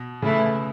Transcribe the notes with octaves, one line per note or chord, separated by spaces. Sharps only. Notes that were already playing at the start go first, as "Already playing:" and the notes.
Already playing: B2
C#3 E3 A3 E4